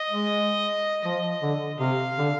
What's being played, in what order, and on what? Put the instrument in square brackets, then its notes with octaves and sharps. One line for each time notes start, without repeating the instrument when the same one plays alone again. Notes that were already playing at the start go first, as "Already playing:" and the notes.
Already playing: [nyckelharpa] D#5
[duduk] G#3
[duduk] F3 [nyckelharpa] D#5
[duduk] D3
[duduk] C3 [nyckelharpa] F5
[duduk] D3